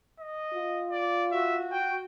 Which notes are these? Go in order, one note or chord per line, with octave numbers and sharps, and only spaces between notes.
D#5
F4
D5
F#4 E5
G5